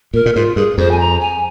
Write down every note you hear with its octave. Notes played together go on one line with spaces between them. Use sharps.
A#2 A#4
A#2
G#2 F4
G2 G#4
F2 C5
G#5
A#5
G#5